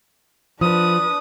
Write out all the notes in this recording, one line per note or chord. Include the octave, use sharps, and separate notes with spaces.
F3 D4 B4 D#6